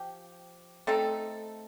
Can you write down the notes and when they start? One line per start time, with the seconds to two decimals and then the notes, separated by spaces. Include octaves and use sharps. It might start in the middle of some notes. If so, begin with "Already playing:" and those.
Already playing: F3 G4
0.87 A3 C4 D#4 A4